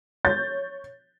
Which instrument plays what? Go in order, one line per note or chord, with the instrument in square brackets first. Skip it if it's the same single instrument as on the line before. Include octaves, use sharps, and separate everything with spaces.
[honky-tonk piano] C#5 G6 A6